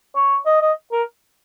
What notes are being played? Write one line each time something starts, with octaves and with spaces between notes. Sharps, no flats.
C#5
D#5
D#5
A#4